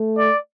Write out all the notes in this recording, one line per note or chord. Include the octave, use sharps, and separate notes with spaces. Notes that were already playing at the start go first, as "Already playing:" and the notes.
Already playing: A3
D5